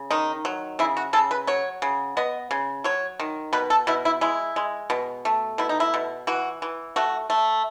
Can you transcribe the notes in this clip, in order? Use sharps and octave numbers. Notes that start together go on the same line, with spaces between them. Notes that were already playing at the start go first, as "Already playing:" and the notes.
Already playing: C#3
D#3 D#4
F#3
C#3 E4
F#4
C#3 A4
B4
F#3 C#5
C#3
B3 D#5
C#3
F#3 C#5
D#3
B2 B4
A4
B2 E4
E4
G#3 E4
G#3
B2
A3
B2 E4
D#4
E4
B2
E3 F#4
E3
A3 F#4
A3